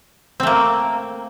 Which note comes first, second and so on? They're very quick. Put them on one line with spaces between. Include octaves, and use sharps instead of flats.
C4 A3 A#3